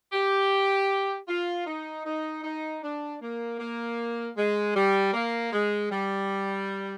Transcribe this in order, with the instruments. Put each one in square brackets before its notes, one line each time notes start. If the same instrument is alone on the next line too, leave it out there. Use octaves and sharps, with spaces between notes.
[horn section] G4
F4
D#4
D#4
D#4
D4
A#3
A#3
G#3
G3
A#3
G#3
G3